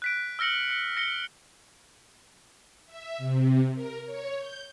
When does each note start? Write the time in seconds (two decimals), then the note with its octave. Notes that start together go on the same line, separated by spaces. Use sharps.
0.02 F#6 B6 D7
0.39 E6 F6 A#6 C#7 F#7
0.71 C#7
0.97 A#6 C#7 G7
2.86 E5
3.18 C3
3.73 A#4
4.05 C#5
4.37 G6